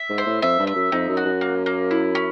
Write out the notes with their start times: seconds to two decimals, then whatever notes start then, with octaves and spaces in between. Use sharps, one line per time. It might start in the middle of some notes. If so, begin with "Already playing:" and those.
Already playing: E5
0.10 G#2
0.18 C5
0.26 A2
0.42 F2 E5
0.59 G2
0.67 E5
0.75 F#2
0.92 F2 D#4
1.09 F#2
1.17 F#4
1.25 F#2
1.41 A#3
1.66 A#3
1.91 E4
2.15 C#4